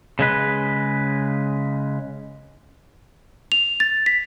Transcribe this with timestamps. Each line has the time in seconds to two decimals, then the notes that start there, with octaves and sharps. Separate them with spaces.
0.19 C#3 G#3 B4
3.52 F7
3.80 A6
4.06 B6